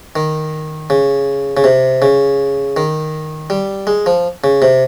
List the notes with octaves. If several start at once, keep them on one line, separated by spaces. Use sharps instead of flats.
D#3
C#3
C#3
C3
C#3
D#3
G3
G#3
F3
C#3
C3